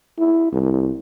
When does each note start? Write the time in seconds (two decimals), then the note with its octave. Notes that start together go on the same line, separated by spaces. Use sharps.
0.19 E4
0.52 C2